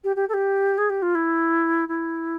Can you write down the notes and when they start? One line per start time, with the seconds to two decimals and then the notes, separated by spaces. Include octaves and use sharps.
0.04 G4
0.16 G4
0.29 A4
0.34 G4
0.78 G#4
0.89 G4
1.02 F4
1.15 E4
1.88 E4